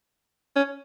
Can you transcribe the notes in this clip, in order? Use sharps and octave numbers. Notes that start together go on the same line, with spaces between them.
C#4